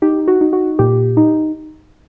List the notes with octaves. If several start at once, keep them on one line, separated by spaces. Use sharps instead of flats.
D#4 G4
F#4
D#4
F#4
A#2 G4
D#4